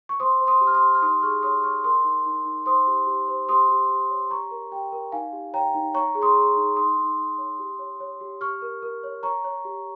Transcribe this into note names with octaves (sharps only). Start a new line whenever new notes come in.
C#6
C5 C6 D#6
C5
C6 D#6
G4
F6
C6 D#6
G4
F6
D#4 C6 D#6
G#4 C#6 F6
C#5 C6 D#6
C#5 C#6 F6
A#4 C6 D#6
D#4
D#4
D#4
C5 C6 D#6
G4
G4
C5
G4 C6 D#6
G4
G4
C#5
G4 A#5 C#6
A#4
G4 G5
A#4
D#4 F5 G#5
G4
C#5 G5 A#5
D#4
C#5 A#5 C#6
G#4
C6 D#6
G#4
D#4
D#4 C6 D#6
D#4
D#4
C#5
G4
C#5
C#5
G4
G4 C#6 F6
A#4
A#4
C#5
C#5 A#5 C#6
C#5
G4